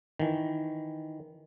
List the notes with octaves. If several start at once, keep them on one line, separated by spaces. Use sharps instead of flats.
D#3 E3